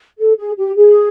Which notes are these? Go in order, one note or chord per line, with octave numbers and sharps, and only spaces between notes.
A4
G#4
G4
G#4